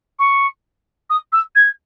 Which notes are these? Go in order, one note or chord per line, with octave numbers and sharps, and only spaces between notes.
C#6
D#6
E6
G#6